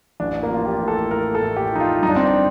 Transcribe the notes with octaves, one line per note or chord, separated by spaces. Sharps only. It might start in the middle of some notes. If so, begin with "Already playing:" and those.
A1 D4
A#3
F3 F4
G4
A2
A4
A2 A#4
A4
A2
G4
F3 D#4
F4
G1 D#4
D4
C4
D4